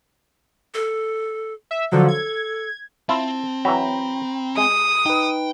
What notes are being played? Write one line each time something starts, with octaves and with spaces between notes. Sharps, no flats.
A4
E5
D3 F3 F#3 A4
G#6
C4 E4 F4 A5
E3 F#3 G5 A#5 B5
G#3 D#6
D#4 B4 G5